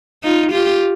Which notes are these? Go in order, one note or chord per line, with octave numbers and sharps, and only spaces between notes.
D#4 F4
F4 G4